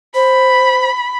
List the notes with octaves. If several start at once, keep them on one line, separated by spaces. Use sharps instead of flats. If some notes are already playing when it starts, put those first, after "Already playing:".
C5 B5